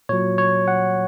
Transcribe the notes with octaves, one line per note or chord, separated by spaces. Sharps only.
A#2 F#3 C#5
C#5
F#5